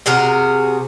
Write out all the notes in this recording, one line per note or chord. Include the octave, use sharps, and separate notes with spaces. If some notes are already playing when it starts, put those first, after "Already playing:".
C3 F#4 G#4 A#4